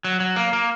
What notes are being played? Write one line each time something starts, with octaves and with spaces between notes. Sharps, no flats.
F#3
F#3
A#3
A#3